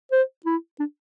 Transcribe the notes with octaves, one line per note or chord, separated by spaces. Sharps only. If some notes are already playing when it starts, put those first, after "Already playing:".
C5
E4
D4